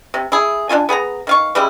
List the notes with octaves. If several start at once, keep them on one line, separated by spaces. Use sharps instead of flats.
C3
E4 G#4
D4 E4 F4 G#5
B3 G#4 F#5 A#5
D#3 F5 C#6
C#3 G3 G#3 E4